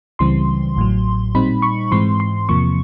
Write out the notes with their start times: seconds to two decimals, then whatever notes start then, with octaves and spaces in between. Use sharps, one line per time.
0.19 C#2 C#3 E3 G3 C4 C6
0.76 A1 A2 F#3
1.35 A#2 G3 C4 D#4 B5
1.62 C#6
1.91 G#2 E3 G#3 C4 C6
2.20 C6
2.49 E2 C3 F3 A#3 C#6